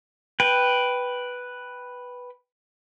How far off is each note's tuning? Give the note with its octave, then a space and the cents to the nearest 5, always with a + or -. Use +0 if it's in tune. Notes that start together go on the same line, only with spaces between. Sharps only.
B4 +0 G5 +0